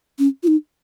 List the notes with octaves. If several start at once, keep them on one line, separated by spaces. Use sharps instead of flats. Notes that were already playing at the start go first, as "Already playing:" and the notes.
C#4
F4
D#4